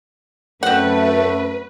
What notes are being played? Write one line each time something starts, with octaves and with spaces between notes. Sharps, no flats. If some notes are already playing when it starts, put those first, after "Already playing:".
F#2 A3 C4 B4 F#5